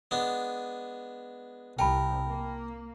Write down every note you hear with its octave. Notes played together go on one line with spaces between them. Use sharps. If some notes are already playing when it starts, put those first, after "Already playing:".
G#3 B3 D4
C2 A#4 G5 A5 B5
A#3